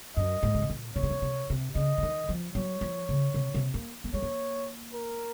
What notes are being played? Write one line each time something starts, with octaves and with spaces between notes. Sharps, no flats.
F#2 D#5
G#2
C#3
C3
A#2
C3 C#5
C#3
C3
C3
C3
C#3 D#5
C#3
D#3
F3
F#3 C#5
F3
C#3
C3
C3
A#3
A#3
G#3 C#5
A#3
A#4